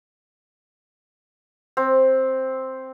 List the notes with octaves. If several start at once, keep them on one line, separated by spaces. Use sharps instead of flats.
C4